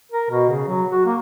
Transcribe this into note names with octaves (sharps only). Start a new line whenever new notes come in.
A#4
B2
C#3
F#3
F#4
A#3